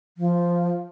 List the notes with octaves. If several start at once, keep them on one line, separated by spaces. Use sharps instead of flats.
F3